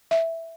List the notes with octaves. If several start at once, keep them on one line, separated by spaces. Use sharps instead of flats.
E5